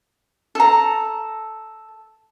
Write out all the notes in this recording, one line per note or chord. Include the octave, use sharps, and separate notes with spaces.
A4 A#5